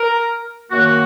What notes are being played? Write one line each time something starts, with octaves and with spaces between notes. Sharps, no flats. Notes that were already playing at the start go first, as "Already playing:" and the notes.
Already playing: A#4
F#2 D#3 A#3 F#4